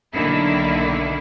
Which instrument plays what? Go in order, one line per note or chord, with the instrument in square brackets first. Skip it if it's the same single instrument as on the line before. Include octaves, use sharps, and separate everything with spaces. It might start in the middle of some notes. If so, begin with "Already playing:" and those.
[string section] B1 D3 D#3 A#3 E4